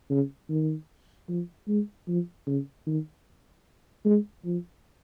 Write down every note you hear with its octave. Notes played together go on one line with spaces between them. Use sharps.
C#3
D#3
F3
G#3
F3
C#3
D#3
G#3
F3